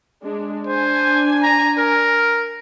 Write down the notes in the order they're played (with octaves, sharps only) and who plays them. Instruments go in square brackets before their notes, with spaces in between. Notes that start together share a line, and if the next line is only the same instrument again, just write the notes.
[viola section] G#3 D4
[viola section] D4 G#5 [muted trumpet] C5
[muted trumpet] A#5
A#4